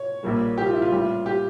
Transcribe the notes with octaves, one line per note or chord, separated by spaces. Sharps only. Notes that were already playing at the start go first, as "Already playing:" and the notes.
Already playing: C#5
A#1 A#2 G3 A#3
G4
F4
E4
F4
A1 A2 G3
G4